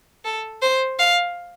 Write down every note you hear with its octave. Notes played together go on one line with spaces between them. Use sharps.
A4
C5
F5